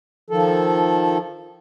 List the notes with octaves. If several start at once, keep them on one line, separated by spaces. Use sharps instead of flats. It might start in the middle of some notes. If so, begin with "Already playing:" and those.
D#3 F3 A4